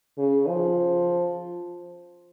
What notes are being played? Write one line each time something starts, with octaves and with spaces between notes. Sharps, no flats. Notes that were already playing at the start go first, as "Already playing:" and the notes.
C#3
F3